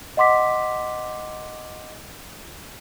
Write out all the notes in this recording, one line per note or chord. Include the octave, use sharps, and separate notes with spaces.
D#5 F#5 C6 D6 B6